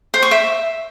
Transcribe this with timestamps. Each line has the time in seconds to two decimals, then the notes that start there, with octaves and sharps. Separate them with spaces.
0.14 C5
0.22 C#6
0.31 E5